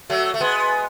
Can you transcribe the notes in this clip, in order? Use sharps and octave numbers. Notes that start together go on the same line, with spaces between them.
F#3 A3
A3
G#3 B3